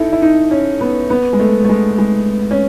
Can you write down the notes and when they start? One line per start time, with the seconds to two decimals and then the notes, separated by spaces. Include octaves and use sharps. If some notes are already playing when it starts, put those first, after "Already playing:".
Already playing: D#4 E4 A4
0.12 E4
0.22 D#4
0.51 C#4
0.81 B3
1.10 B3
1.33 G#3
1.39 A3
1.64 A3
1.69 G#3
1.98 G#3
2.51 C#4